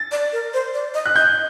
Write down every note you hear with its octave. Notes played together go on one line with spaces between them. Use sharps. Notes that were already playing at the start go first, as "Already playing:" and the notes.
Already playing: A6
D5
A#4
C5
D5
D#5
F#6
D#5 G6